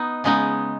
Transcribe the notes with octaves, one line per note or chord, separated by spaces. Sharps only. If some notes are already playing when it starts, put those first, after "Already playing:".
Already playing: B3 D#4
C#3 G#3 B3 D#4